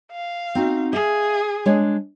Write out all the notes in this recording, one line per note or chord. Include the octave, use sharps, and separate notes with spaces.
F5
C4 D#4 F#4
G#4 E5 F5
G#3 D4 C#5